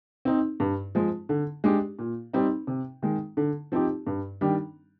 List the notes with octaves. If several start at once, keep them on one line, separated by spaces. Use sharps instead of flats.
C4 D#4
G2
F3 G#3
D3
G#3 D4 G4
A#2
G3 C4 D#4
C3
D#3 G#3
D3
F3 C4 D#4 G4
G2
D#3 G3 D4